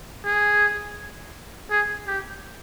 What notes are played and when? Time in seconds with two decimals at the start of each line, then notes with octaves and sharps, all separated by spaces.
0.25 G#4
1.70 G#4
2.07 G4